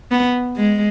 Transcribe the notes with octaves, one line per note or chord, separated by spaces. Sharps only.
B3
G#3